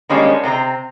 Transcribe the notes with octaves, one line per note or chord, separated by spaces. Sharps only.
D#3 G3 G#3 A#3 C#4 D4
C3 C4 D4 A#5